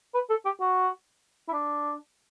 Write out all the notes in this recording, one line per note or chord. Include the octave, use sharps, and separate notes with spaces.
B4
A4
G4
F#4
E4
D4